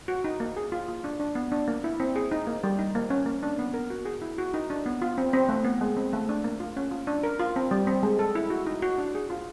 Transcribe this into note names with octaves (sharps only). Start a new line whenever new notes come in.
F#4
D#4
A#3
G#4
F4
F4
D4
D4
B3
D4
A#3
E4
C4
G#4
D#4
A#3
G3
D#4
A#3
C#4
A#3
D4
B3
A#4
F#4
G#4
E4
F#4
D#4
D4
B3
F4
C4
C4
A3
B3
G#3
C4
A3
D4
A#3
F4
C#4
F4
D4
A#4
F4
C4
G3
C4
G#3
A4
E4
F#4
D#4
F#4
D4
G#4
F4